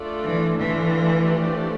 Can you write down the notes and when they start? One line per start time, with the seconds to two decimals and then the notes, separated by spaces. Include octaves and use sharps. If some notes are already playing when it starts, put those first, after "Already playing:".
Already playing: A3 D4 F4 A4 D5
0.24 E3
0.58 D3 E3 A3 D4 F4 A4
1.25 F3 A3 D4 G4 D5